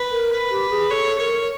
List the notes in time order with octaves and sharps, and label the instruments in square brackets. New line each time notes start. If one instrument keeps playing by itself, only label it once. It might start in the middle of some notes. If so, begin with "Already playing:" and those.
Already playing: [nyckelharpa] B4
[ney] A#4
[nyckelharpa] B4
[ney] G4
G#4
[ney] A4 [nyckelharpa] C#5
[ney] A#4 [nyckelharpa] C#5